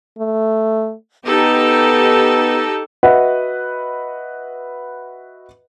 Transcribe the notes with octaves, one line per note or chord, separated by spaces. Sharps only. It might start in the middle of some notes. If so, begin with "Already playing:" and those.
A3
B3 D#4 G4 A4
F#4 B4 D#5 E5 F#5